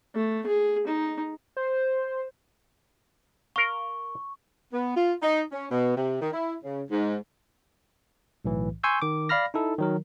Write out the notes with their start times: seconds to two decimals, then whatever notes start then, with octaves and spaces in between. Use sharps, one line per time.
0.15 A3
0.47 G#4
0.87 D#4
1.57 C5
3.56 A#4 F5 C#6
4.73 B3
4.96 F4
5.22 D#4
5.52 C#4
5.71 B2
5.96 C3
6.21 D#3
6.33 E4
6.63 C#3
6.90 G#2
8.45 B1 A2 E3
8.84 G#5 C6 C#6 E6 G6
9.02 D#3 D6
9.29 D5 F5 B5 F6 A#6
9.54 D#4 E4 A4
9.79 D#3 F#3 A#4